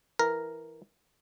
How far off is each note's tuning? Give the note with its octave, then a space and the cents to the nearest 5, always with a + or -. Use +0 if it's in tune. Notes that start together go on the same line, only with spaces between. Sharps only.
E3 +0 A#4 +0